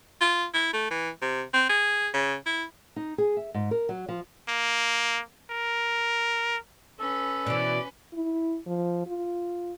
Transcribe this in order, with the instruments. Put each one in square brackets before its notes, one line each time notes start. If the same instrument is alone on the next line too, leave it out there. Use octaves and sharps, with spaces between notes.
[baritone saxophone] F4
E4
A3
E3
C3
C4
G#4
C#3
E4
[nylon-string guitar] D#4
G#4
E5
G#2
A#4
F#3
F3
[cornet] A#3
A#4
[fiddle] C#4 B4 [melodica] A4
[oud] B2 E3 [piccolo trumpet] D5
[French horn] E4
F3
F4